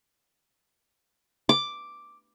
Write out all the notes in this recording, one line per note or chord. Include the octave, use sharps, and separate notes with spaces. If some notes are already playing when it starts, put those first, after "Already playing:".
D6